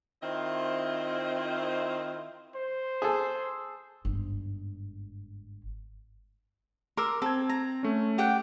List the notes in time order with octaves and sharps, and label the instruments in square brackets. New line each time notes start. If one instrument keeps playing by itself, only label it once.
[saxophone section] D#3 C4 E4 F4 C5 D#5
[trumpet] C5
[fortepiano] G#4 A4
[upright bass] G1 G#2
[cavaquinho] A#4 [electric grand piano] C6 D6 E6
[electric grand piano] C4 G#6 [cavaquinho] A4
[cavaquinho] A#5
[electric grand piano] A3 C#4
[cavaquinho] G4 F#5 G5